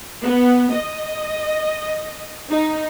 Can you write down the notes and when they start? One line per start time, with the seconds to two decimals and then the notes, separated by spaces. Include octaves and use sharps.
0.23 B3
0.73 D#5
2.50 D#4